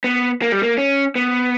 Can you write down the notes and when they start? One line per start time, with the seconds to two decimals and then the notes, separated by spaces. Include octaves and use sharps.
0.04 B3
0.42 A#3
0.52 G3
0.63 A#3
0.78 C#4
1.15 B3